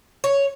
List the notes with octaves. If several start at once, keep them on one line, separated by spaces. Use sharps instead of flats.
C#5